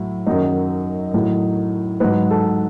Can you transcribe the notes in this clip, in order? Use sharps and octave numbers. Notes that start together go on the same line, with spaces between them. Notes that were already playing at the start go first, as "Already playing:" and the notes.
Already playing: A2 F#3 E4
F#2 D#3 F#3 D#4
A2 F#3
G#2 F#3 B4
A4